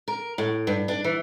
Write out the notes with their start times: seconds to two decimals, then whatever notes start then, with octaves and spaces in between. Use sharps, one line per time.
0.08 A#4
0.38 A2
0.67 G2
0.88 D4
1.04 E3